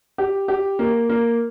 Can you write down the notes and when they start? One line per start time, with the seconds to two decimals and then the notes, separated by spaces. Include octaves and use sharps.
0.18 G4
0.48 G4
0.79 A#3
1.10 A#3